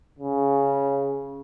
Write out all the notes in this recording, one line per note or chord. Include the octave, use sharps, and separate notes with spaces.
C#3